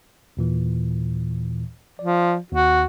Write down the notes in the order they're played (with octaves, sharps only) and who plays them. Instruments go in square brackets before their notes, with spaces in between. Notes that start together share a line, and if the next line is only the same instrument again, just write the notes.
[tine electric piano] D#2 A#2 E3
[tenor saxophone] F3 [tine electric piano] D5
[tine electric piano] D#2 [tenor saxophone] F#4